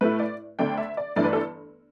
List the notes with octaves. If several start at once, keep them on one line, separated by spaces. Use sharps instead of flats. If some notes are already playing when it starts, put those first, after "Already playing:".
A2 A3 E4 B4
D5
D2 D3 A3 D4 G5
E5
D5
G1 G2 E3 A3 D4 D5
B4
A4